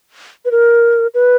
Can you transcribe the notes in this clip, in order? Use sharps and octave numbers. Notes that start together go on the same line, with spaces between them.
B4
A#4
B4